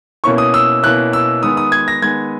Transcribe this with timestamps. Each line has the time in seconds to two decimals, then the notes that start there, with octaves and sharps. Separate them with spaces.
0.24 B2 A#3 C#4 E4 C#6
0.38 D#6
0.54 E6
0.83 B2 A#3 C#4 E4 F#6
1.13 E6
1.43 D#3 G#3 B3 D#6
1.57 D#6
1.72 G#6
1.88 A#6
2.02 D#3 G#3 B3 G#6